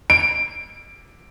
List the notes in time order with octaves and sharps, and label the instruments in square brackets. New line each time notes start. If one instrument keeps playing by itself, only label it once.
[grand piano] D7